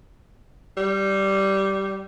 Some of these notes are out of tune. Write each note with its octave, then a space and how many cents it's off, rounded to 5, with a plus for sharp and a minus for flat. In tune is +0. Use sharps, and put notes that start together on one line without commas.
G3 -10